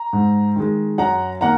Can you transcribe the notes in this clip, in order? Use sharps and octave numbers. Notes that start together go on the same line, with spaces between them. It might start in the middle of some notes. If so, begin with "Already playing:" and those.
Already playing: A#5
G#2
D#3 G#3
F#2 F#5 A#5
D#3 A#3 F#5 A#5